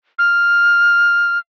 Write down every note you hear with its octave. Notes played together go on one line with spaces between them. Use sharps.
F6